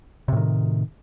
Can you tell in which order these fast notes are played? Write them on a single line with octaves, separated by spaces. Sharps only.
C3 A2 D#3